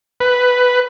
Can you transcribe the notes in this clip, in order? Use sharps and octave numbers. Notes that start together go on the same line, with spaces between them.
B4